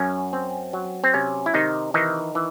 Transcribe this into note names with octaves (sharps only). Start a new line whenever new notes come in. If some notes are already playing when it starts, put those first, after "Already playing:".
Already playing: F#2 C#4
C4
F#3
C4
C3 C#4
E4
C3 D#3 D#4
D#3 E3 D#4
E3